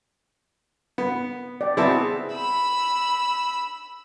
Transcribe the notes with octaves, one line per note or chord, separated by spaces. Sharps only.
B3
D5 G5
B3 C4 E4 G#4 E5 A5
B5 E6